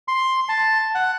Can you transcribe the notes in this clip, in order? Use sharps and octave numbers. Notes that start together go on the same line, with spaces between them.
C6
A5
F#5